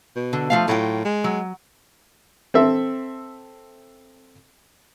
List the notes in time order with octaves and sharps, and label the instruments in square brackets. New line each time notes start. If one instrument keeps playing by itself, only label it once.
[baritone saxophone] B2
[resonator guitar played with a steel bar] D3
F3 A3 F5
[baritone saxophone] A2 [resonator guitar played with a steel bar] F#3 F4 G5
[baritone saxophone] G#3
[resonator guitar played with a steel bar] F#3
[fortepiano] C4 A4 E5